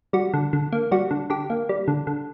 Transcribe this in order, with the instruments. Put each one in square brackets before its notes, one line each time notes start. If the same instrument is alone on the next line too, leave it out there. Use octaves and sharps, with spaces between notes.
[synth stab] G3 F#4
D3
D3
A#3
G3 F#4
D3
D3 G4
A#3
G3
D3
D3